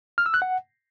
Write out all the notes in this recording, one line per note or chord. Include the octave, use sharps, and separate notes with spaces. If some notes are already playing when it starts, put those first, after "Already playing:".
F6
E6
F#6
F#5